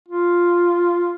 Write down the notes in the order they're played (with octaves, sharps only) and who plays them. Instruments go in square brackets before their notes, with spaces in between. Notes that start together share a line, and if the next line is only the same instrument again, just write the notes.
[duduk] F4